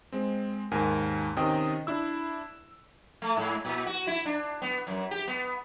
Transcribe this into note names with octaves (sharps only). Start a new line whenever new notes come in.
G#3 C4
D#2 G#2 A#4 G#5
C3 D#3 C#4 D#5 G5 D#6
D4 E4 E6
A3
G#2
A#2
F#4
E4
D4
B3
F#2
G4
B3